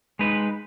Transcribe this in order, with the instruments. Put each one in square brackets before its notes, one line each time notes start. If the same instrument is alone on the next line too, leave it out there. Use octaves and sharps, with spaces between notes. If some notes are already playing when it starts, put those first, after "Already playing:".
[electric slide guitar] G#3 D#4 B4